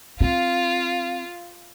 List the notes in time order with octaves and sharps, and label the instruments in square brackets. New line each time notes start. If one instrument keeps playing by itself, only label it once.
[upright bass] C4 [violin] F4 F5